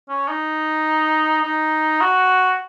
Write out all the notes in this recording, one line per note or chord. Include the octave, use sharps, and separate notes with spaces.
C#4
D#4
D#4
F#4